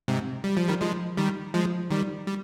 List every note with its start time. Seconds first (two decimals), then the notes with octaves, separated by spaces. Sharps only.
0.08 G#2 C3
0.44 G3
0.57 F3
0.68 D#3 G3
0.81 F3 G#3
1.17 D#3 G3
1.54 F3 G#3
1.90 D#3 G3
2.27 G3